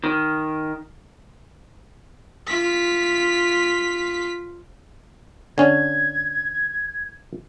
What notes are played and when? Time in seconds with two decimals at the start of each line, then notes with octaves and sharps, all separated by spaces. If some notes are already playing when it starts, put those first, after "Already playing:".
0.04 D#3
2.47 F4 B6
5.58 D3 C#4 G#6